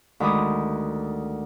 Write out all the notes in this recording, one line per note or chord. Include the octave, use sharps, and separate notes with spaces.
D2 D#3 G#3 B5 D6 D#6